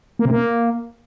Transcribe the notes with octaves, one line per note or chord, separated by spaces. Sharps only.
A#3
C3
A#3